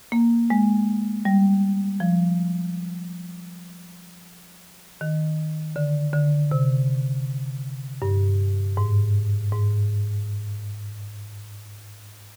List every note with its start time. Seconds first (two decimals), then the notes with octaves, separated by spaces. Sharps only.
0.12 A#3
0.50 G#3
1.25 G3
2.00 F3
5.01 D#3
5.76 D3
6.13 D3
6.51 C3
8.02 G2
8.77 G#2
9.52 G#2